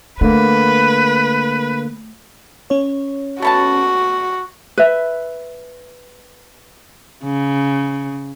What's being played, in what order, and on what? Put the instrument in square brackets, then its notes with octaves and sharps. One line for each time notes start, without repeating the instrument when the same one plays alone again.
[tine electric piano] D3 A#3 [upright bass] A3 [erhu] B4
[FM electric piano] C#4 C#5
[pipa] A3 B3 A5 [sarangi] F#4
[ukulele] B4 E5
[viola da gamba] C#3